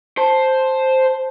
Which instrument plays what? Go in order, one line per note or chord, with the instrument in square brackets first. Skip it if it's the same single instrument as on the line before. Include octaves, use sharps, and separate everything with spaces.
[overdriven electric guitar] C5 [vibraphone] A5